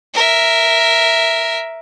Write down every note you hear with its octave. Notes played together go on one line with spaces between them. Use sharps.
A#4 E5